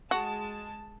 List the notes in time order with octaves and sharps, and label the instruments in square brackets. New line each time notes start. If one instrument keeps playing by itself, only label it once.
[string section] G#3 A5 [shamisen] F#4